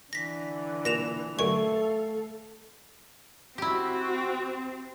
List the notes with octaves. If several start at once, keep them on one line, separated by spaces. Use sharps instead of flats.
D3 E3 A#6 B6
A#2 A#6 E7 F7
F#2 D3 A3 A4 F5 G#5 C#6
C4 E4 F#4 G4